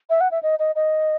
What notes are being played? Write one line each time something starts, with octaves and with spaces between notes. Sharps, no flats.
E5
F#5
E5
D#5
D#5
D#5